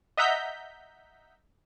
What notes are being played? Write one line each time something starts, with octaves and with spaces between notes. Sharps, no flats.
D#5 E5 F#5 A#5 G6 B6